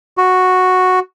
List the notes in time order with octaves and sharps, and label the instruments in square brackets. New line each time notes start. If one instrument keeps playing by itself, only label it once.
[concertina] F#4